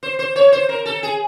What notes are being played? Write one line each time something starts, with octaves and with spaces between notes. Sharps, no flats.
C5
C5
C#5
C5
A#4
A4
G#4